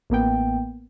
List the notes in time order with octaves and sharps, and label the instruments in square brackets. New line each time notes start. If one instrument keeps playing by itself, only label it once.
[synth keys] A1 A#3 B3 G5